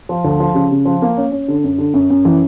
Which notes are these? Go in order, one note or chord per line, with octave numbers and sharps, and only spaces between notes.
F3
D2
F3
C#3
C#3
F3
A#3
C#4
C#4
D3
F#2
D3
F#2
F#2
E3